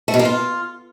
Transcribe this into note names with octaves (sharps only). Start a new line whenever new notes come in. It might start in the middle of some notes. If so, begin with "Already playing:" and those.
A3
B2
A#3
F4